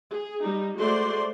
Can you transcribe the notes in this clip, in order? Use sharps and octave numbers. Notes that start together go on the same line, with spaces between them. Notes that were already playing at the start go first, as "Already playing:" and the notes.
G#4
G3 D#4
G#3 A3 F#4 C5 D5 C6